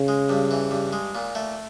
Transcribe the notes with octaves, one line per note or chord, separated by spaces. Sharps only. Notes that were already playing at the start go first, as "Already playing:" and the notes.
Already playing: C#3
G#3
G2
E3
G2
G#3
A#2
A3